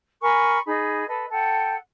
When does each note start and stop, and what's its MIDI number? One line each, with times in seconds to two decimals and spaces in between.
0.21 0.58 70
0.21 0.58 80
0.21 0.58 83
0.21 0.58 85
0.65 1.06 63
0.65 1.06 68
0.65 1.06 83
1.06 1.25 69
1.06 1.25 71
1.06 1.25 75
1.30 1.75 69
1.30 1.75 78
1.30 1.75 79